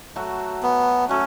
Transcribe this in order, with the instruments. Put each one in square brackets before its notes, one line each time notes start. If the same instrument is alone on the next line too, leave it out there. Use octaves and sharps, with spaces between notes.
[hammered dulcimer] F#3 A3 F#4
[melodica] B3
[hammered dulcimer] F#3 A3 F#4 [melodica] C#4